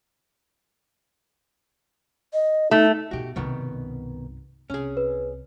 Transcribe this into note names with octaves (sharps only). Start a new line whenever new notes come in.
D#5
A3 D#4
G2 B2 F#4 G4
C2 G2 B2 D#3 B3
C2 C#4 G#4
B4